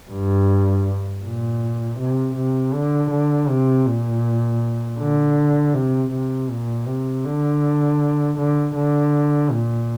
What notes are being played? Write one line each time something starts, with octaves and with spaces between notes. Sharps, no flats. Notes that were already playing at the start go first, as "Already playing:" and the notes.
G2
A#2
C3
C3
D3
D3
C3
A#2
D3
C3
C3
A#2
C3
D3
D3
D3
A#2